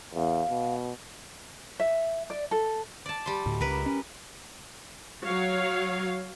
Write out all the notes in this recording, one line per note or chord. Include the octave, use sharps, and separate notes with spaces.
E2 F5
B2
E5
D5
A4
D5 A5
G3 C6
D2 A2
C#2 A#4 B4
C#4
F#3 C#5 F5